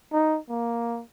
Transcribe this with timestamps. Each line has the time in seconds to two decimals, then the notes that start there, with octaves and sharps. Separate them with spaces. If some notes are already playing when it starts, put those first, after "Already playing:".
0.13 D#4
0.49 A#3